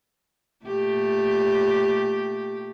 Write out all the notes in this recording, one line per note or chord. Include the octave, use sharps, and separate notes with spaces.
A#2 A3 G4